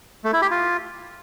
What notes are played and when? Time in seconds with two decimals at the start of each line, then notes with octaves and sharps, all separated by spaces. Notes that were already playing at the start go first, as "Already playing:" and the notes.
0.24 A3
0.33 E4
0.42 G4
0.51 F4